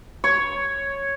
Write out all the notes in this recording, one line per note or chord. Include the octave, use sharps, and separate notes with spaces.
C#5